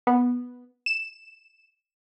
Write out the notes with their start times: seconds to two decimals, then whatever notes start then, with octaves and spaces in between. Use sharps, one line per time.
0.07 B3
0.86 E7